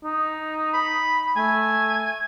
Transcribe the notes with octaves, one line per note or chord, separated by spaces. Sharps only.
D#4
B5
A3 G#5